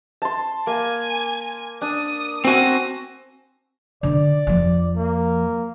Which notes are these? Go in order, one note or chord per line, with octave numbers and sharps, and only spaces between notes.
A5 C6
A#3 G#5
D4 D#6
C4 F#4 C5 G#5 E6 A#6
D3 D5
F2 F3
A#3